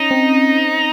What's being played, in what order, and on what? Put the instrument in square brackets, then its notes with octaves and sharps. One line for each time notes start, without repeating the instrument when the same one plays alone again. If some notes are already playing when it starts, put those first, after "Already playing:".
Already playing: [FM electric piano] C#4 [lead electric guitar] D#4
[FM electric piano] C4